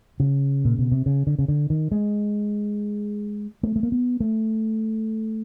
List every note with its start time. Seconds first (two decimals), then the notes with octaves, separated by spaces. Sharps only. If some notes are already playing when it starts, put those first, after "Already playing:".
0.20 C#3
0.65 A#2
0.78 B2
0.92 C3
1.06 C#3
1.27 D3
1.39 C#3
1.48 D3
1.70 D#3
1.91 G#3
3.63 A3
3.76 A3
3.83 A#3
3.92 B3
4.20 A3